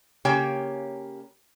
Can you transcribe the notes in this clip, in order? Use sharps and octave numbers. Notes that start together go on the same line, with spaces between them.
C#3 A#3 G4 C#5 G5 G#5